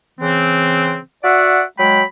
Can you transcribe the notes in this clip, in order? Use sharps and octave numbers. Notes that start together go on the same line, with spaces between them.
C#3 E3 C4
F#4 D5 E5 F#5
F#3 G#3 G5 B5